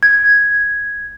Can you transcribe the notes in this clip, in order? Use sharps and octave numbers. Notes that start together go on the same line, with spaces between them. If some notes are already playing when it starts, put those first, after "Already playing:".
G#6